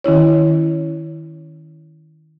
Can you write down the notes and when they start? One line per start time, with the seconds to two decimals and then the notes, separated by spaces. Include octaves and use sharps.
0.04 D#3 C#4 E4 C#5